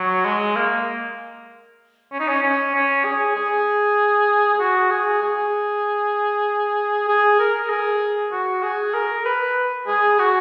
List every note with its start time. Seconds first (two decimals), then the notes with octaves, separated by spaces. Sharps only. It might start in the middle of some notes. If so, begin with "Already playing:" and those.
Already playing: F#3
0.25 G#3
0.56 A#3
2.12 C#4
2.20 D#4
2.29 C#4
2.43 C#4
2.74 C#4
3.05 G#4
3.36 G#4
4.55 G#4
4.60 F#4
4.91 G#4
5.22 G#4
7.08 G#4
7.40 A#4
7.70 G#4
8.32 F#4
8.63 G#4
8.94 A#4
9.25 B4
9.88 G#4
10.19 F#4